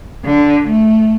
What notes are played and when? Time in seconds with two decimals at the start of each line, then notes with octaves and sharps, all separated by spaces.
0.25 D3
0.65 A3